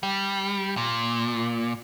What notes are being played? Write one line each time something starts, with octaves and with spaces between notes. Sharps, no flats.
G3
A#2